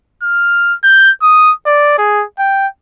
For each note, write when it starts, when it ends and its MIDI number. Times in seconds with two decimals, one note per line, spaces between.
0.23 0.74 89
0.83 1.11 91
1.22 1.52 87
1.66 1.95 74
1.98 2.24 68
2.39 2.67 79